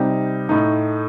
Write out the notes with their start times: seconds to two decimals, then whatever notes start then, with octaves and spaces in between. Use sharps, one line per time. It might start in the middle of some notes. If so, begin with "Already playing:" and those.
Already playing: C3 G3 C4 D#4 G4
0.49 A2 A3 D#4